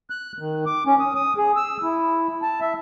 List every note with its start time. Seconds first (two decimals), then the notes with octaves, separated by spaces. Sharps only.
0.10 F#6
0.39 D#3
0.66 D6
0.86 C#4
1.00 D#6
1.15 D#6
1.37 G#4
1.56 E6
1.83 E4
2.42 A5
2.61 E5